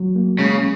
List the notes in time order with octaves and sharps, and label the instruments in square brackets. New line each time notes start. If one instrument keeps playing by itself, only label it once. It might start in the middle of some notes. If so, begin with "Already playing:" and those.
Already playing: [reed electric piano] F#3
A#3
[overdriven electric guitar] C#3 [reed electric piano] G#3